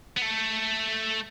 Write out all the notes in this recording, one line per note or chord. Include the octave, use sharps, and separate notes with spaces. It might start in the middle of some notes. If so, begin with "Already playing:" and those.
B3
A3